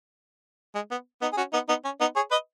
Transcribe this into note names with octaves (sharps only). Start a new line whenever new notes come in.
G#3
B3
B3 D#4
G#4
C#4 F#4
B3 D#4
B3 D#4
C#4
B3 D#4
G#4 C#5
B4 D#5